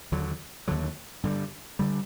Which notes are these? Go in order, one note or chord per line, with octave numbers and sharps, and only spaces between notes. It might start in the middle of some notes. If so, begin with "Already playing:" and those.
D#2 D3 F#3
D#2 D3 F#3
G2 D3 G3
D3 G3